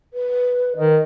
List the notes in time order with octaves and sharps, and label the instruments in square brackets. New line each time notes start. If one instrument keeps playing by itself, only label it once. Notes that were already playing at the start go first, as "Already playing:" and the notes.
[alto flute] B4
[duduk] D#3 [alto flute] D#5